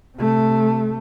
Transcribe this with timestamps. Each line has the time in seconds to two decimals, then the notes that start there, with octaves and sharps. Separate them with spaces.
0.17 C3 A3